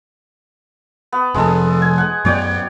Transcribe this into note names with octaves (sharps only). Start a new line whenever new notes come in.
B3
F1 F2 G#3 A4
G#5
F#5
F#2 F#3 B3 C#5 D5 G5